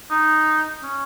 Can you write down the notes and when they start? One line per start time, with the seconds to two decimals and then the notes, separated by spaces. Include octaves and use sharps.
0.11 D#4
0.83 C#4